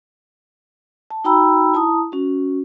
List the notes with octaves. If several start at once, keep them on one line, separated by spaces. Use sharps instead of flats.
A5
D#4 F#4 G5 A#5 B5 E6
E4 A5 A#5 D#6
C#4 F#4